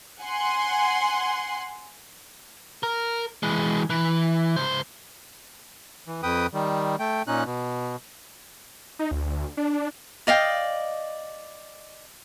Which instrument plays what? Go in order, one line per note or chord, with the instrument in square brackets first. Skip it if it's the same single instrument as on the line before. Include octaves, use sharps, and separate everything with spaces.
[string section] F#5 G#5 C6
[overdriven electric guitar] A#4
E3 G#3
E3
C#2 C5
[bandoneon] E3
F2 B4 G5 D#6
D#3 G3
A3 G5
A#2 C#4 D#4 F#6
B2
[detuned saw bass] D#4
D2
D4
[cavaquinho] D5 D#5 F5 G5